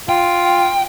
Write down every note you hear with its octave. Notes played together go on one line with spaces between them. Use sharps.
F4 G5